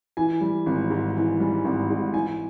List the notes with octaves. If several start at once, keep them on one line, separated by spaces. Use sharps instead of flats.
E3 G#5
G3
G#1
G#2
E3
G3
G#1
G#2
E3 G#5